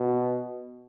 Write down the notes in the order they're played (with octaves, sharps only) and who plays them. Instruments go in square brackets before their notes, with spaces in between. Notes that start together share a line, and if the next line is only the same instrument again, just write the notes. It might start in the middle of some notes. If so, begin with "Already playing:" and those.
Already playing: [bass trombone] B2